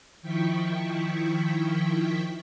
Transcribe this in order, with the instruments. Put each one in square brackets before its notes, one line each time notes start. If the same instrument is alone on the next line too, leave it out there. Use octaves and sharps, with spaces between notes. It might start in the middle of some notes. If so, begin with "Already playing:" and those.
[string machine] D#3 F3 E4 G5 C#6 B6